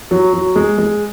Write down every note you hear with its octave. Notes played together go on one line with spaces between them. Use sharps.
F#3
F#3
G#3
G#3